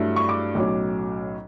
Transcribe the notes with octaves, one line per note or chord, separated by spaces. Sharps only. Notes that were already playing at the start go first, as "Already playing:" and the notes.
Already playing: G2 F#3 A3 E4
C#6
D6
B1 A2 F#3 C#4